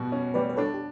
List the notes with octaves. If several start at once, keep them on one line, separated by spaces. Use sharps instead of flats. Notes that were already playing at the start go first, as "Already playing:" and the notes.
Already playing: B2 G3 F#4
C#4
G3 B4 D5
B4
D4 A4 C#5
G4